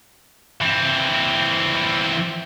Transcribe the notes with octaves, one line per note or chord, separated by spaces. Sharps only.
E3 C4